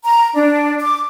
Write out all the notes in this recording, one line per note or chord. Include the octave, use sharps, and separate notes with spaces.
A#5
D4
D6